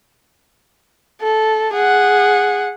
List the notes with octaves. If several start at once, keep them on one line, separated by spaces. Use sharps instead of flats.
A4
G#4 F#5